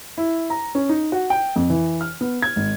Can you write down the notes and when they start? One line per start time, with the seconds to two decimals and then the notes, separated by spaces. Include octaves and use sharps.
0.18 E4
0.50 A#5
0.75 C#4
0.89 D#4
1.12 F#4
1.30 G5
1.56 F2
1.70 E3
2.01 F6
2.21 B3
2.42 G#6
2.56 G#1